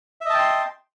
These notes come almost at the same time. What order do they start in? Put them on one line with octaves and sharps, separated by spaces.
E5 D#5 A5 G5 C6